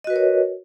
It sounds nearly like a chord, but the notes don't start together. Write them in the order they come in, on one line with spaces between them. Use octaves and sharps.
D#5 F#4 B4 A#4 C#5